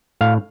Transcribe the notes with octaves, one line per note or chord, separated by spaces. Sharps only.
A2 F5